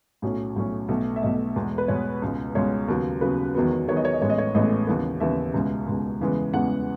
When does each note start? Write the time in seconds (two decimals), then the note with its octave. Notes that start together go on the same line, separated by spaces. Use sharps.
0.22 B1 A2 F#3 C#4
0.56 B1 A2 F#3 C#4
0.89 B1 B2 A3
1.16 E5
1.22 B1 B2 A3 D#5
1.56 E2 B2 G#3 B3
1.78 B4
1.88 E2 B2 G#3 B3 C#5
2.22 C#2 B2 G#3
2.55 C#2 B2 G#3 C#5
2.88 D#2 C#3 F#3 B3
3.21 D#2 C#3 F#3 B3 B4
3.55 E1 E2 D#3 F#3 B3
3.88 E1 E2 D#3 F#3 B3 C#5
3.97 D#5
4.05 C#5
4.13 D#5
4.21 A1 A2 G#3 B3 C#5
4.30 D#5
4.38 C#5
4.54 A1 A2 G#3 B3 D#5
4.87 D#2 C#3 E3 B3
5.20 D#2 C#3 E3 B3 E5
5.54 C#2 B2 G#3
5.87 C#2 B2 G#3
6.20 E2 C#3 E3 G#3 B3
6.53 E2 C#3 E3 G#3 B3 F#5